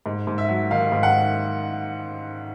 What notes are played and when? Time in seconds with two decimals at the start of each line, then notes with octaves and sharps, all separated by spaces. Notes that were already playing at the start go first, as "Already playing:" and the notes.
0.06 G#2
0.27 G#2
0.38 E5
0.49 F#3
0.71 D#3 F5
0.92 G#2
1.03 F#5